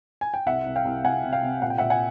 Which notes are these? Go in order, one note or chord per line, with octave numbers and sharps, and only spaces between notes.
G#5
G5
C2 E5 F#5
C2
F5 G5
C2
C2 F#5 G#5
C3
F5 G5
C3
A#2 F#5
G5
A#2 E5 F#5
F#5 G#5